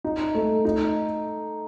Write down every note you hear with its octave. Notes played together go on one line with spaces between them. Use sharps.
D#4
A3
D#4